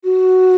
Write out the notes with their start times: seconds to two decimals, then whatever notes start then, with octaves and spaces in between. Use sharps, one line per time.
0.04 F#4